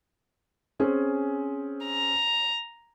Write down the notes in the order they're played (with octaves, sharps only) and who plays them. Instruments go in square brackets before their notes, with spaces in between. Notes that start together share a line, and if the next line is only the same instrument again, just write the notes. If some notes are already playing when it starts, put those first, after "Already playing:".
[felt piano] C4 C#4 G#4
[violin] A#5